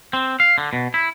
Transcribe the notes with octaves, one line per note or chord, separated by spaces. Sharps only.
C4
F5
D3
B2
E4